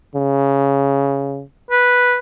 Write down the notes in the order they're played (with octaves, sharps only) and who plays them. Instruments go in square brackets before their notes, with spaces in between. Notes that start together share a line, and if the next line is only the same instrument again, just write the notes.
[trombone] C#3
[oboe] B4